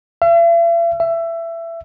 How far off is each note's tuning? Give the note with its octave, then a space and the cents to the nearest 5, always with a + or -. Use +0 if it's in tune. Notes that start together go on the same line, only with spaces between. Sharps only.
E5 +45
E5 +20